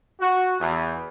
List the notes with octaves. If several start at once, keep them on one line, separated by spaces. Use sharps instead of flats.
F#4
E2